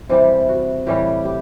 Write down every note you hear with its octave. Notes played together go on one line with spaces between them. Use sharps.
C3 E3 G3 G4
F#4
A2 E3 G3 G4
G4